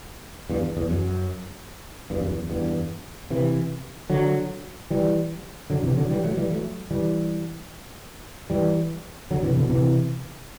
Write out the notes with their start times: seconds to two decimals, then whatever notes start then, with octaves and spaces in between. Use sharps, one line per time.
0.49 E2 G2
0.77 E2
0.90 F#2
2.10 E2 G2
2.20 F#2
2.31 E2
2.50 E2 G2
3.30 C3 E3
4.10 D3 F#3
4.90 E3 G3
5.70 D3 F#3
5.83 C3 E3
5.97 D3 F#3
6.10 E3 G3
6.24 F#3 A3
6.37 E3 G3
6.50 F#3 A3
6.91 E3 G3
8.50 E3 G3
9.31 D3 F#3
9.43 C3 E3
9.57 B2 D3
9.70 C3 E3